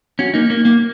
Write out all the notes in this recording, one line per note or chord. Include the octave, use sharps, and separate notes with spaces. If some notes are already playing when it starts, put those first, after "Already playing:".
C#4 F#4
A#3 D#4
A#3
A#3